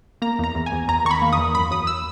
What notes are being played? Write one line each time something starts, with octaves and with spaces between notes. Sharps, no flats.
A#3 A#5
E2 A#5
E2
G#5
E2
E2 A#5
D#3 C#6
B5
A#3
D#6
E2
F#2 B5
F#2 D#6
E6